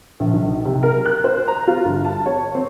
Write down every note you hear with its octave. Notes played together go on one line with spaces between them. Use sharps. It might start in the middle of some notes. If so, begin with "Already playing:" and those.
A#1
B1
C3
A#4
F#6
C5
A#5
F4
G1
A5
C#5
C4